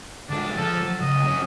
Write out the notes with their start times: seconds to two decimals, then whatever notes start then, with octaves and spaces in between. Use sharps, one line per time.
0.30 D2 G#3 D4
0.57 F3 A4
0.82 F#3
1.01 C#2 D#5
1.23 F#3 C#4